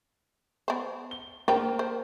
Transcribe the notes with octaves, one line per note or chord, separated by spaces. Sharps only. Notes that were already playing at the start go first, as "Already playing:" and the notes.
B3 C5
G7
A#3 D4 C5 G5
C5